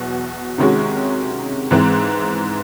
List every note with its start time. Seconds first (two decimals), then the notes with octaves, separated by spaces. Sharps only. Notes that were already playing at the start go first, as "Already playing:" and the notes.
Already playing: E2 B2 F#3
0.58 C3 D#3 G#3 C#4 F#4
1.71 G#2 E3 G#3 C4